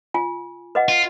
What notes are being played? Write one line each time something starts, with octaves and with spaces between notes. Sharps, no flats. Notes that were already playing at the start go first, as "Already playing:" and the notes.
F4 G#5
B4 D#5 F#5
F4